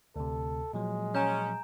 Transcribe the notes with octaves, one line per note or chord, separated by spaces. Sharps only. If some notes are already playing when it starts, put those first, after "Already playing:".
D2 C3 A4
A#2 F3 F#3 G#3
C#4 G#5 A#5 G6